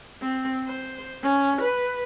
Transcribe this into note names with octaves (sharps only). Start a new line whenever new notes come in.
C4
C5
C#4
B4